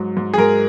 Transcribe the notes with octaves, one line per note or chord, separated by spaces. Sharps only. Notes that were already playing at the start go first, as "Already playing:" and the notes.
Already playing: G#2 F#3
G#2
G#4
G#2 A#4